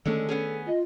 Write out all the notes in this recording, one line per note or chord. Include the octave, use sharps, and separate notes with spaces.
D3 D#3 G#3 A3 C#4 A4
B3 C#4 G#4
F4 D#5